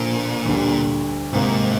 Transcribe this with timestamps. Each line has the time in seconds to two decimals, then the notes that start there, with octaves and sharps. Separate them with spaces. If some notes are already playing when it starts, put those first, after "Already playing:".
Already playing: A#2 D3 F3 A#3
0.45 D2 D3 G3
1.33 G#2 C3 D#3 A#3